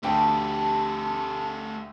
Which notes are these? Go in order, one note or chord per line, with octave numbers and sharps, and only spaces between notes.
D2 A3 G4 B4 G5 A5 D6